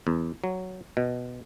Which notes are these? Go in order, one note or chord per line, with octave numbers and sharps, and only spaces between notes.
E2
F#3
B2